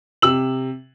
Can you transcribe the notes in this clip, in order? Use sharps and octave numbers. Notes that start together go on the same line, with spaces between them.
C3 E6 F#7